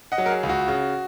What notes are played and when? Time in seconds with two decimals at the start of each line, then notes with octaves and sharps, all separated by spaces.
0.12 D#5 F#5
0.18 F#3
0.26 A#4
0.31 G#4
0.43 C#2
0.49 F#4
0.68 C#3